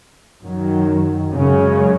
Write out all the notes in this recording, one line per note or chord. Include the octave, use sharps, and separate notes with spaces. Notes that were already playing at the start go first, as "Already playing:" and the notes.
F#2 D#3 F#3
F#2 C#3 G#3 C#4